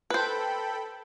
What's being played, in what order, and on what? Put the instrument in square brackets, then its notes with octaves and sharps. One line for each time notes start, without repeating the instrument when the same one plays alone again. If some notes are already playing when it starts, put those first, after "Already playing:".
[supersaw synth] A4 G5 B5 [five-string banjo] B4 C5